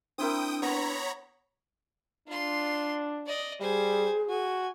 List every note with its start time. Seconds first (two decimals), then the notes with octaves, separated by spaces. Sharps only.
0.18 C4 D4 E4 A#4 G5 D#6
0.62 B3 C#5 A#5 B5
2.28 D4 F4 C6
3.26 D5 D#5
3.61 G3 G#4 C5 G#5
4.29 F#4 G#5